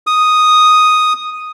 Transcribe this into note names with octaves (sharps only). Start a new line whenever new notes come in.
D#6